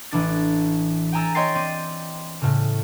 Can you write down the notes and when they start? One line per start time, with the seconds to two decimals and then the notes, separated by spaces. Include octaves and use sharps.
0.11 A1 E3 D4 A6
1.12 G5 G#5 A#5 E6 A6
1.35 C#5 D#5 G5 C6 A6 C7
1.55 C4 D5 D#7
2.42 A2 C#3